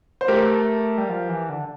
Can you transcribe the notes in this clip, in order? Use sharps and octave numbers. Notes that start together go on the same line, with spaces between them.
C5
A3 G4 A#4
G3
F3
E3
D3